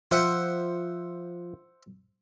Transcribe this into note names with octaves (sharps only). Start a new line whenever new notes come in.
F3 C5 E5 F#5